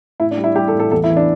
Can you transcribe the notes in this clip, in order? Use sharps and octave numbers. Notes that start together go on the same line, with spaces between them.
A2 E4
D4
G3
E4
G3 G4
A4
A2
A4
E2 A4
E4
E3
D4